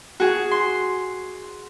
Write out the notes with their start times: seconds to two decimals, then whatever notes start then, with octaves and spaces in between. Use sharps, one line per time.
0.20 F#4 G#4
0.51 C6